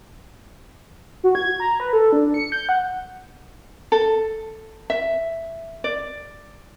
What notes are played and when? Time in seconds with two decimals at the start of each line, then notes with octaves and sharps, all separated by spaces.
1.24 F#4
1.35 G#6
1.60 A#5
1.80 B4
1.93 A4
2.13 D4
2.34 C#7
2.52 G6
2.69 F#5
3.92 A4
4.90 E5
5.84 D5